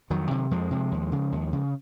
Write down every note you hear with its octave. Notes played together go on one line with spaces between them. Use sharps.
F2 D#3 F#3
C3
F2 F3 G#3
C3
D#2
C#3
D#2
C#3